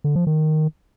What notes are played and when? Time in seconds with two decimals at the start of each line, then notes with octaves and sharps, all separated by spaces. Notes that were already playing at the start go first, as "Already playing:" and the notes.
0.04 D3
0.16 F3
0.27 D#3